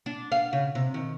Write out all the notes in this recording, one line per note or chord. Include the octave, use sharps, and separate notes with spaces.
D4
F5
C#3
C3
D#3